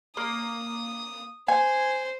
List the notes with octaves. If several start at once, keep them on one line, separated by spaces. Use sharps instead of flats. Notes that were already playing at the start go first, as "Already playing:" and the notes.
A#3 D#6
C5 G#5